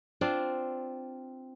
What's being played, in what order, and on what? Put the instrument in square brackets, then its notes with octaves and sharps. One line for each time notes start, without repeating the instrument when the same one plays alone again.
[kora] C4 D4 F4